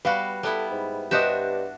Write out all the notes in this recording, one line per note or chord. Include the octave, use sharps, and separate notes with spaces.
G3 B3 F#4 B4 F5
G3 B3 E4 A4
G#2
G2 D4 F#4 G4 C5 D#5 E5